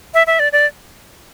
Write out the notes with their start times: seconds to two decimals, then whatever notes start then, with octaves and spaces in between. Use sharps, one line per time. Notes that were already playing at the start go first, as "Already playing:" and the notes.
0.14 E5
0.27 E5
0.39 D5
0.52 D5